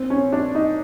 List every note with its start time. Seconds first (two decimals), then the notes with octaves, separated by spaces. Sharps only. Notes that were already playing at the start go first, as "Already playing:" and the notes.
Already playing: C4
0.10 C#4
0.32 D4
0.55 D#4